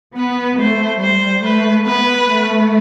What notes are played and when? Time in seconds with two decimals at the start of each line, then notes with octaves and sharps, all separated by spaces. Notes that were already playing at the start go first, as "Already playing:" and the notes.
0.16 B3 B4
0.59 A3 C5
1.01 G3 C5
1.44 A3 B4
1.87 B3 B4
2.30 A3